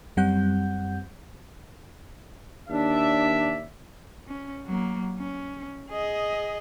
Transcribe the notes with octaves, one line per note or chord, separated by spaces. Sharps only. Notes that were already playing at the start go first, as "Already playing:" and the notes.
F#2 G3 C4 F#5 G6
D#2 D4 D5 E5
C#4
F#3 A#3
C#4
G#4 D#5